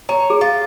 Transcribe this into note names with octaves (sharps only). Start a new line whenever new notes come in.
C#5 A#5
G#4
F4